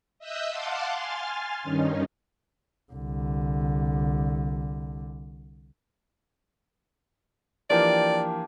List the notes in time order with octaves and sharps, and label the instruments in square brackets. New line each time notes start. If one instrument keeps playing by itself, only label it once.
[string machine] D#5 E5 D#6 E6 F#6 G6
F5 F#5 A5 C6 D6
G#5 C6 F6 A6
G2 D#3 C#4 D#4
[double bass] C2 D3
[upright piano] E3 F3 A#3 [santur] D4 G4 [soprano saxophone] D5